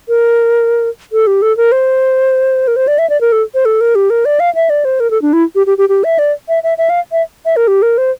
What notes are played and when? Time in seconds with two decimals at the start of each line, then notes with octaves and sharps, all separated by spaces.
0.08 A#4
1.13 A4
1.27 G4
1.42 A4
1.57 A#4
1.72 C5
2.68 A#4
2.76 C5
2.88 D5
2.99 E5
3.10 D5
3.21 A#4
3.32 A4
3.54 C5
3.65 A4
3.81 A#4
3.95 G4
4.10 A#4
4.25 D5
4.40 F5
4.55 E5
4.70 D5
4.85 C5
5.00 A#4
5.11 A4
5.22 D4
5.33 E4
5.55 G4
5.67 G4
5.78 G4
5.89 G4
6.04 E5
6.19 D5
6.49 E5
6.63 E5
6.78 E5
6.90 F5
7.12 E5
7.45 E5
7.56 A#4
7.68 G4
7.82 A#4
7.98 C5